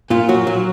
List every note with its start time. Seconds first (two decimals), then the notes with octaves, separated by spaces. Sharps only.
0.10 A#2 F4
0.29 F#3 F#4
0.47 F#3